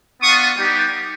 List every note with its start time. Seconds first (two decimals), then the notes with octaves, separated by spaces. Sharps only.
0.22 B3 D4 F4 C#6 D#6
0.57 G3 B3 D#4 G4